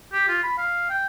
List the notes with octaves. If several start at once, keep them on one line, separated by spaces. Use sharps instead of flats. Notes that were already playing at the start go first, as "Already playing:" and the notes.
G4
F4
B5
F5
G5